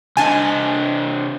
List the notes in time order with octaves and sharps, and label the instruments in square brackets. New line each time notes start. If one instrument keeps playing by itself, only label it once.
[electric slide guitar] C3 D4 D#5 [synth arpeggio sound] G#5 A5